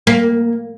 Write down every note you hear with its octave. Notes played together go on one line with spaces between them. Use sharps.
A#3